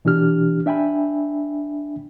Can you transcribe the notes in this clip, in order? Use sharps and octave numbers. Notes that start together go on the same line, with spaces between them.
B2 E3 D4 G4 F6
D4 E5 G5 G#5 B5